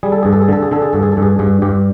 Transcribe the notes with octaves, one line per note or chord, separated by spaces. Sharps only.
G3 G#4
A4
G2 G#4
A4
G#4
D3 A4
G#4
D3 A4
G#4
G2 A4
G#4
A4
G2
G#4
G2 G#4
G2 G4